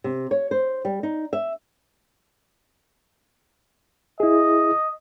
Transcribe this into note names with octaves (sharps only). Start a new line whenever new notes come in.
C3
C#5
C5
G3
D#4
E5
E4 G#4 D#5